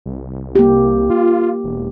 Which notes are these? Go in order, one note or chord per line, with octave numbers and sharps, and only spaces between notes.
C2
A#3 G4
F4
E1